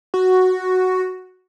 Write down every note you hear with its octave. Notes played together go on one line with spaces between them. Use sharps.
F#4